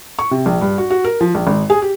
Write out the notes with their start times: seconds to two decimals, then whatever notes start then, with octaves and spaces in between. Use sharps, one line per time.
0.19 C#6
0.31 C3
0.46 A#1
0.61 G2
0.78 F#4
0.90 F#4
1.04 A#4
1.21 F3
1.35 A#1
1.47 G#1
1.70 G#4
1.82 G4